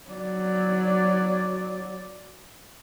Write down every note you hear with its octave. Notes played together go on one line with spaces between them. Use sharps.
F#3 D5